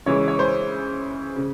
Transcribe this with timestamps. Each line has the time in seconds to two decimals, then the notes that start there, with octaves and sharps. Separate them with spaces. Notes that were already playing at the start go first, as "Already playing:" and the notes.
0.06 C#3 E3 G#3 C#5
0.28 C#5
0.39 C5
1.36 C#3